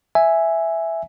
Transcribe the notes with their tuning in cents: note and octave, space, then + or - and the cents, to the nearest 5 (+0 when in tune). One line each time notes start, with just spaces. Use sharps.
E5 +0 G#5 +0